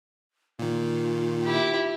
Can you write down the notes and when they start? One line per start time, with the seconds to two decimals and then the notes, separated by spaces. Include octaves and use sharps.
0.59 A#2 D#3 F4
1.44 E4 G4